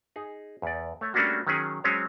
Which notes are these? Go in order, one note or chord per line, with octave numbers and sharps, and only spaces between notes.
D#4 G#4
E2 D5
A3 C#5
G3 A3 A#3 C#4 D4 F#4
D#3 F#3 C#4 G#4
F#3 G#3 C4 C#4 C#5